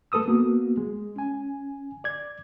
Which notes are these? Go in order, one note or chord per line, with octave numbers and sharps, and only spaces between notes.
A3 A4 B4 D#6 E6
A#3 B3 F#4
G#3
C#4 G#5
D5 G#6